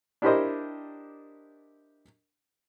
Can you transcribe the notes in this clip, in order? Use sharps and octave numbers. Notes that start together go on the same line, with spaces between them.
D4 E4 G4 A#4 C5 D#5